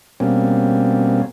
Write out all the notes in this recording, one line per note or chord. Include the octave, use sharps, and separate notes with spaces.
B2 G3 A#3 C4 C#4